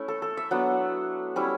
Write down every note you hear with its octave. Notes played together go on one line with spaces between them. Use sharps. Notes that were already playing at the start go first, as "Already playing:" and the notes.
Already playing: A3 C#4 E4
A4
A4
E5
F#3 B3 D4 F#5
G3 C#4 E4